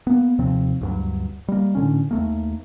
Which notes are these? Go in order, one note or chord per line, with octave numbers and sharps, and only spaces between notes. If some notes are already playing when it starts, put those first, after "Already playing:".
A#3 B3
D#2 C3 F3 C4
D2 G2 F#3
G3 A#3
A2 D3 C#4
D#2 A3 A#3